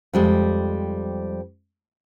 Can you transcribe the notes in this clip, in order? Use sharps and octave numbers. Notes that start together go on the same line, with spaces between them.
F2 G3 G#3